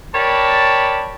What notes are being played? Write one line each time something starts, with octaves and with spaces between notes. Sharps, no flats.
G4 A#4 C#5 D5 A5 B5